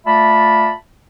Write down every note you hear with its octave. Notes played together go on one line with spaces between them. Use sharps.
A3 F4 D5 E5 A5 B5